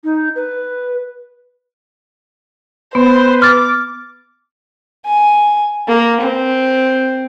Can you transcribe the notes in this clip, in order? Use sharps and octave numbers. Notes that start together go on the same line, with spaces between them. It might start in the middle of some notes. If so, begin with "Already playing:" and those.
D#4
B4
B3 B4 C5
D6 F6 A6
G#5
A#3
C4